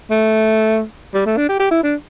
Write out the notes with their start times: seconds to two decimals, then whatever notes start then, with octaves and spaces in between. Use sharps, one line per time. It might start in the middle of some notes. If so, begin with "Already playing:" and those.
0.10 A3
1.14 G3
1.26 A3
1.37 D4
1.49 G4
1.60 G4
1.71 E4
1.83 D4